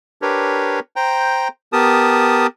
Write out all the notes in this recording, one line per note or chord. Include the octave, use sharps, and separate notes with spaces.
D4 G4 A#4 B4 C#5
C5 G5 A#5
B3 G4 A#4 A5 D#6